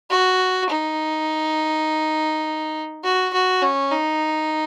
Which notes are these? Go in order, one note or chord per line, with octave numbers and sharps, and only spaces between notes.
F#4
D#4
F#4
F#4
C#4
D#4